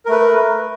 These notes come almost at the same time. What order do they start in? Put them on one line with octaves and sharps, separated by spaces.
A#4 A3 B4